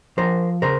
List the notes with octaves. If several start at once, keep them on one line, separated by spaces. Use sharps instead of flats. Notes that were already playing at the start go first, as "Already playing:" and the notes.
F3 A#4 C5
C#3 A#4 C5